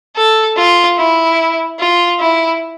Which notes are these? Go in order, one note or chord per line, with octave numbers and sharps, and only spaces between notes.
A4
F4
E4
F4
E4